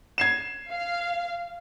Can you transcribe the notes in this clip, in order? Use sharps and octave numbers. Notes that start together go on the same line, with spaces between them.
G#6 C7 E7
F5